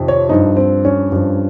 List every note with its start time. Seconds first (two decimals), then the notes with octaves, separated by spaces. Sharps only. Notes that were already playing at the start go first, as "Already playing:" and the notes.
Already playing: F2 C3 D#3
0.08 C#5
0.29 G2 F3 D#4
0.57 C4
0.85 C#4
1.12 G2 F3